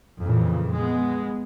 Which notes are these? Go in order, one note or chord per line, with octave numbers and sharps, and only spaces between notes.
F2 A#2 C#3 E3
G#3 B3